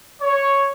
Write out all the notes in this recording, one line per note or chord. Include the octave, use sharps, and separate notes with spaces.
C#5